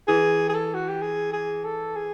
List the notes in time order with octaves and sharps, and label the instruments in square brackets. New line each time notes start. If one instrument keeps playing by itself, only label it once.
[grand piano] E3 [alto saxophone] G#4
[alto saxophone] G#4
A4
F#4
G4
G#4
G#4
A4
G#4